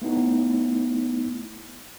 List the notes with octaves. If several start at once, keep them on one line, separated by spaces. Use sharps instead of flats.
A3 B3 D#4 E4